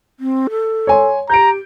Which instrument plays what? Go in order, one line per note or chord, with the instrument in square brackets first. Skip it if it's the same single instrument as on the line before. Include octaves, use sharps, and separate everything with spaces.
[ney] C4
A4
[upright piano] C#5 G#5 C6
[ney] G4 [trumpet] A#5 [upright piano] G6 D7